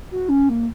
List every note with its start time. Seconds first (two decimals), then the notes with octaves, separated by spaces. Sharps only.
0.10 F#4
0.28 C#4
0.48 A#3